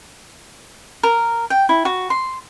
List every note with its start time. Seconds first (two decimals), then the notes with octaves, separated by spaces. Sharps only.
1.03 A#4
1.50 G5
1.69 E4
1.85 F#4
2.10 C6